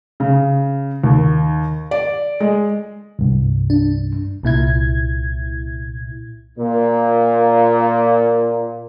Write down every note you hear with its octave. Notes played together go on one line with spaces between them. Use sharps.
C#3
D#2
D5
G#3
C2 G2
D4
C2 A#2 E4 G#6
A#2 A#3